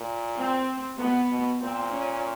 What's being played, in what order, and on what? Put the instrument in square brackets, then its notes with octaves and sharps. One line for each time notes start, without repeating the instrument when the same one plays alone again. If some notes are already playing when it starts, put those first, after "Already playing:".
Already playing: [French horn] A#2
[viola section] C4
[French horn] B2 [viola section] B3
[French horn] B2
[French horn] A#2 [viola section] C4
[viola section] C#4